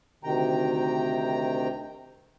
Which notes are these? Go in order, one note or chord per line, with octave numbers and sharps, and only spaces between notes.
D2 C3 D#3 G5 A#5